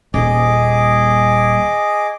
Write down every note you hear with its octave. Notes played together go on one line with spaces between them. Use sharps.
D#1 G#4 D#5 D6